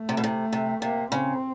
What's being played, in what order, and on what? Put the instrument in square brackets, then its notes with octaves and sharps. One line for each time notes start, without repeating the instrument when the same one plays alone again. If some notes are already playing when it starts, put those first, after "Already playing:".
Already playing: [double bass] A3
[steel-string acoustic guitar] C3
B2
C3
C3
[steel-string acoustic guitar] C3 [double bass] A#3
[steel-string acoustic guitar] C#3 [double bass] C4